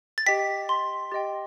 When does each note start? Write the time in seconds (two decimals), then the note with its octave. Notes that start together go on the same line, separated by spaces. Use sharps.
0.18 A6
0.26 G4 D#5 G5 B6
0.69 C6
1.11 G4 D#5 G5 A6